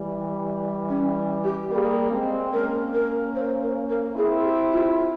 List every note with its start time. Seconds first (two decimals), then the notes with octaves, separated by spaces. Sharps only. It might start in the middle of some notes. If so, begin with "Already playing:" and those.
Already playing: E3 G3
0.89 C#4
1.44 G4
1.71 G3 A#3 G#4 A#4
2.12 G#3 C4
2.52 A#3 C#4 A#4
2.94 A#4
3.35 C5
3.62 A#4
3.90 A#4
4.17 C4 E4 G#4
4.44 G4
4.72 F4
4.99 F4